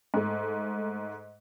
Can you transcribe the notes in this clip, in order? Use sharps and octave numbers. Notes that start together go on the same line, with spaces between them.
G#2 A3